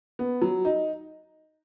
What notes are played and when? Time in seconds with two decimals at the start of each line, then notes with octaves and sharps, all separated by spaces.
0.19 B3
0.42 F#3
0.65 D#4